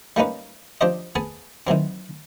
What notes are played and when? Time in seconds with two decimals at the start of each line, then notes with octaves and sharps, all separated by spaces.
0.16 G3 A#3 C#4 D#4 B4
0.81 F3 D4 G4 C5 D#5
1.15 B3 G#4 G#5 A5
1.67 D#3 E3 F#3 C4